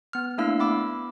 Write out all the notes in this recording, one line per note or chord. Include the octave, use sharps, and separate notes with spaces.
B3 F6
A3 A#3 D4 E4 F5 E6
B3 B5 D6 E6